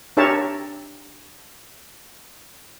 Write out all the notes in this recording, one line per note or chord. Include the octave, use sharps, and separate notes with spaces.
D4 G4 A#4 C#5 E5 A5